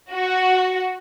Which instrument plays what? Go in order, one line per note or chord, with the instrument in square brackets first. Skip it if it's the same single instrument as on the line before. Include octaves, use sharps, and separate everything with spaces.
[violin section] F#4